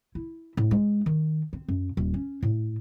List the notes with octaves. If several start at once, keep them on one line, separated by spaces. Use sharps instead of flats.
E4
A2
G#3
D#3
C4
F#2
D#1
C#4
A2